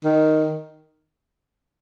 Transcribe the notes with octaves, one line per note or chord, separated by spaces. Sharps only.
D#3